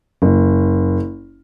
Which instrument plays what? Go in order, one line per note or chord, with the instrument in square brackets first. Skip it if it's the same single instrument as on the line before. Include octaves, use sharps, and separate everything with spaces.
[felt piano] F#1